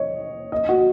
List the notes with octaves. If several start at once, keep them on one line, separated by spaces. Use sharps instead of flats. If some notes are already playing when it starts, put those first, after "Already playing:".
Already playing: C#5 D#5
D#5
F#4